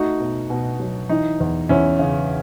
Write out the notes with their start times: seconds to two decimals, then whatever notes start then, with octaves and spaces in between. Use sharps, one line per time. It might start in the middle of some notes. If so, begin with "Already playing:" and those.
Already playing: A3 D#4 F#4
0.20 B2
0.50 B2
0.80 F#3
1.09 E3 D#4
1.40 E2
1.69 E2 C#4 E4
1.99 C#3